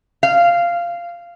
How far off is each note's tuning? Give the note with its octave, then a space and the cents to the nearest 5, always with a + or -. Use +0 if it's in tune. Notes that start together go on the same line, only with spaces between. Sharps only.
F5 -10